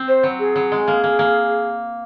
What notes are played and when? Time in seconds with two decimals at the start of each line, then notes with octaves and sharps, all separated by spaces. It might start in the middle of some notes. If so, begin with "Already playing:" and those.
Already playing: C4
0.08 C5
0.23 F#3
0.39 G#4
0.56 F#3
0.72 G#3
0.88 A#3
1.04 A#3
1.19 A#3